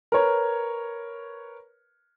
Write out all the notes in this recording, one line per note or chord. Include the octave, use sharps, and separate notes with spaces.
A#4 B4 C#5